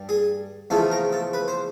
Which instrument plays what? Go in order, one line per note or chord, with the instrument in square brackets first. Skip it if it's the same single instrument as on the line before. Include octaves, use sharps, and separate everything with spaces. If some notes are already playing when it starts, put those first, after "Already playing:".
Already playing: [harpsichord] G2 G3
G#4
E2 C#3 F3 A3 A4
A#4
A4
B4
C5